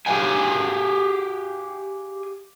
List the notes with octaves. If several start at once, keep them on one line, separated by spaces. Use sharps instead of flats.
G4 G#4 C#5 F5 G5 G#5